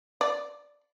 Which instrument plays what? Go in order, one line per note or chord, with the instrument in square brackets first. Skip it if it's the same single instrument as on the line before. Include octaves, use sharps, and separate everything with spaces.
[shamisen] D5